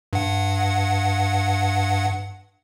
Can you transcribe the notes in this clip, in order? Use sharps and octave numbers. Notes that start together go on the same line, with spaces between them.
G2 F#5